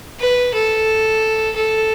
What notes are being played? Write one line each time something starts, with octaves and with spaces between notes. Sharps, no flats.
B4
A4
A4